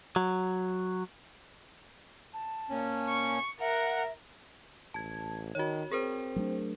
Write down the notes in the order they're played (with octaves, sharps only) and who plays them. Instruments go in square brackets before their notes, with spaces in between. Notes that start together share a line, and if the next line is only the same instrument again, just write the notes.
[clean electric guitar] F#3
[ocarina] A5
[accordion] A#2 C#4
[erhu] C#6
[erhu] A#4 [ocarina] E5 [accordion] F#5
[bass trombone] A1 [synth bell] A5 G#6
[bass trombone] D#3 [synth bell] F#4 C#5
[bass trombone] C4 [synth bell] G#4 A#4 C5
[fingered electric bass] F#3 A3 D4